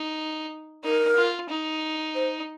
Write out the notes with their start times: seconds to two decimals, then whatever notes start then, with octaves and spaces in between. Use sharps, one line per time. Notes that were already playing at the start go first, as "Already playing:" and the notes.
Already playing: D#4
0.84 D#4 A#4
1.17 F4
1.49 D#4
2.15 C5